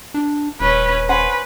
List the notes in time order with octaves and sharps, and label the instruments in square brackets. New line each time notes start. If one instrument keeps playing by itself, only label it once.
[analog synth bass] D4
[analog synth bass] D#1 [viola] C#4 B4
[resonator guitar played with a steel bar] C#4 C5 F#5 [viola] B4